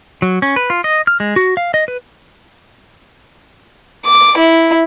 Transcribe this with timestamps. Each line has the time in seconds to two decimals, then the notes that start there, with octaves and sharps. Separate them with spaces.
0.22 F#3
0.42 C#4
0.56 B4
0.70 F4
0.84 D#5
1.07 F6
1.20 G#3
1.36 F#4
1.57 F5
1.74 D#5
1.88 B4
4.06 D6
4.38 E4